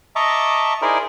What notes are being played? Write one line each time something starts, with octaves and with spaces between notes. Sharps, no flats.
D#5 E5 A5 A#5 C#6 D6
D#4 E4 G#4 A#4 C5 D5